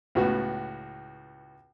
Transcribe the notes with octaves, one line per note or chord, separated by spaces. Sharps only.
C#2 A2 B3 F#4